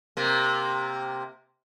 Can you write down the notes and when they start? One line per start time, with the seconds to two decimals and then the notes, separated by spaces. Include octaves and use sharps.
0.17 C3 A#3